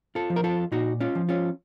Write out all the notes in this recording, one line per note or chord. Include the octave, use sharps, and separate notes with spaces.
F4 A4
F3
A#4
F4 A4
A#2 D#4 F#4
C#4 F4
F3
C#4 F4